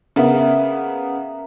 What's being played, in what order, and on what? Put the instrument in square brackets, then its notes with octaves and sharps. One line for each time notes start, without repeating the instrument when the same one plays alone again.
[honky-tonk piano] C#3 B3 [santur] A#3 E5